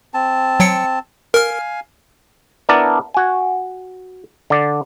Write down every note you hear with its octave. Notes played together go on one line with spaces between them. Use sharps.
C4 A5
F#3 G5 C#7
A#4 F5 G#5 F6
B3 D4 E4 A#4 D5 A5
F#4 G#5
D3 D5